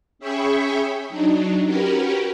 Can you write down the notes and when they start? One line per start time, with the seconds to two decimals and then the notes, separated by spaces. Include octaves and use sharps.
0.19 C#4 G#4 E5 G5 B5 C#6
1.09 F#3 D4 D#4
1.64 C#4 F#4 G4 A#4 B4